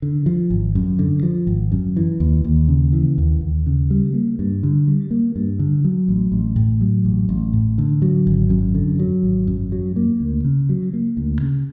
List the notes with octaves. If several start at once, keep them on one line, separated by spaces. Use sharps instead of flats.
D3
F3
G#1
F#2
D3
F3
G#1
F#2
E3
D#2
D#2
C#3
E3
D#2
D#2
C#3
G3
A#3
G2
D3
G3
A#3
G2
D3
F#3
A1
A1
A2
F#3
A1
A1
A2
D3
F#3
G#1
F#2
D3
F#3
G#1
F#2
F#3
A#3
D2
C#3
F#3
A#3
D2
C#3